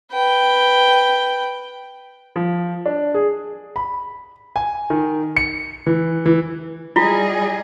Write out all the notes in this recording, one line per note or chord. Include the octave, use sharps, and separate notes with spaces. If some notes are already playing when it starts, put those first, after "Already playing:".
B4 G5
F3
D4
G#4
B5
G#5
D#3
C#7
E3
E3
G3 E4 F4 G#4 D#5